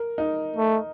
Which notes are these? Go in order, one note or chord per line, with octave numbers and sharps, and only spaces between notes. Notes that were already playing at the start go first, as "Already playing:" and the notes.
Already playing: A#4
D#4
A3